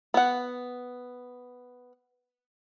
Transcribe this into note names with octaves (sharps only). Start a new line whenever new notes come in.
B3 F#5